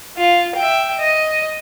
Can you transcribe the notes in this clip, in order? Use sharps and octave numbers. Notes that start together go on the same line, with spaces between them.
F4
E5 G5
D#5